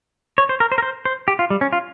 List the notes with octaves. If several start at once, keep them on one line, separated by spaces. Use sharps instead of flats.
C#5
C5
A#4
C5
A#4
C5
C5
G4
F4
G3
C#4
F4